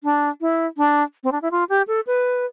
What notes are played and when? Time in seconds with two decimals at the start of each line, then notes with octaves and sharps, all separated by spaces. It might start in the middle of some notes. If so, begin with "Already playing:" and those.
0.04 D4
0.41 E4
0.77 D4
1.24 C4
1.32 D4
1.42 E4
1.51 F4
1.69 G4
1.88 A4
2.07 B4